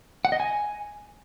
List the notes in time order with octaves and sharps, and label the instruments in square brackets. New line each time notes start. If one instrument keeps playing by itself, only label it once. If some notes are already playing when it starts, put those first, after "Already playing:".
[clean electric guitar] F#5
D#5
G#5